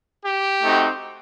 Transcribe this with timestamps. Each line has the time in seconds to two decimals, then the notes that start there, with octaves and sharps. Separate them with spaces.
0.25 G4
0.63 A3 C4 D#4 F#4